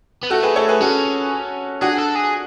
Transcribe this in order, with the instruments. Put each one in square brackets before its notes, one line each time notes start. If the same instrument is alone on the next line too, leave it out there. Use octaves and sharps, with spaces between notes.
[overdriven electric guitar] B3
[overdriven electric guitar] A3 [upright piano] F#4 A4
[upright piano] G#4 B4
A4 C#5
G#4 B4
[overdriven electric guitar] C#4 [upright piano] F#4 A4
[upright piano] D4 F#4 [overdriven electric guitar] G#4
[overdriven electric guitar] A4
G#4